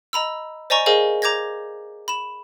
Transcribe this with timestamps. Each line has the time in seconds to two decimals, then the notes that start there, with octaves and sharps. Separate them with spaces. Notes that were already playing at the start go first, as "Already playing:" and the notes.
0.13 D#5 A#5 B5 E6
0.70 C5 D5 D#5 G#5 A#5 C#6
0.86 G#4 A#4 C5 D#5 F5 G#5
1.22 A#5 D6 G6 G#6 A#6
2.08 B5 E7